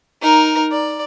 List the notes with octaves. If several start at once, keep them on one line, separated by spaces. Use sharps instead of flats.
D#4 A#4
D5